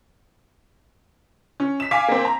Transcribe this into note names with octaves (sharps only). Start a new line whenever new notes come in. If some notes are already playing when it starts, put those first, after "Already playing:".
C#4
B6 E7
F5 G#5 D6 B6
A#3 C4
A#5